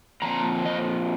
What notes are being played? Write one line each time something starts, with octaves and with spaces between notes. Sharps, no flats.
A#2 F3 C4 A#5
D#5